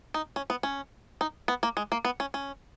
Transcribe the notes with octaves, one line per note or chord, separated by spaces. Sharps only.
D#4
C#4
B3
C#4
D#4
B3
A#3
G#3
A#3
B3
C#4
C#4